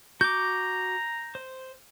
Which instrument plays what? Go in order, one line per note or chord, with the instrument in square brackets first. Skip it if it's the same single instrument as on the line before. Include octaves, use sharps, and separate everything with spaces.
[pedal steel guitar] F#4 D6 [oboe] A#5 [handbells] G6
[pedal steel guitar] C5